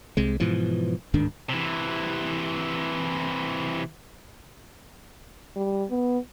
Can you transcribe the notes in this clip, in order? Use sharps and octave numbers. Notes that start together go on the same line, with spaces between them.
C2 C3 G#3
G#2 B2 E3 F3
D1 G#2 D#3 D4
C3 E3
G3
B3